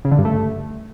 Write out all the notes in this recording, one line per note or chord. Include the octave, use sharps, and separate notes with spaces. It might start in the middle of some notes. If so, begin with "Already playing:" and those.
C#3
D3
G2
A3